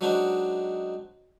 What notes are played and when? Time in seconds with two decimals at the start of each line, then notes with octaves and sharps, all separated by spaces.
0.01 F#3 G#3 C4 D4 D#4 F#4